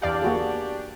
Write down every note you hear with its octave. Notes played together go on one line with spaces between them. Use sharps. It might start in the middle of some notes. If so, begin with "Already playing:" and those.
E2 D4 G4 D5 F5
A#3 F#4 G#4